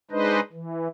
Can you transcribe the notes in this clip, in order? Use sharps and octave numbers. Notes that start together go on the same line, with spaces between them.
G#3 D4 D#4 B4 C5 D#5
E3